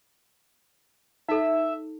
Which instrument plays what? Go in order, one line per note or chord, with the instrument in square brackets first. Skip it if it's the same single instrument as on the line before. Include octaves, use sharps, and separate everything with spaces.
[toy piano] D#4 A4 [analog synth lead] E5